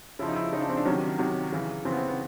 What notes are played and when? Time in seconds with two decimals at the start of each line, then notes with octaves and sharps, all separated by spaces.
0.19 C#3 F3 E4
0.28 D#4
0.36 E4
0.53 C#3 F3 D#4
0.61 D4
0.69 C4
0.77 D4
0.85 C3 D#3 F#3 C#4
1.18 C3 D#3 F#3
1.52 C#3 E3
1.85 C#3 E3 C4
1.92 B3
1.97 C4
2.08 B3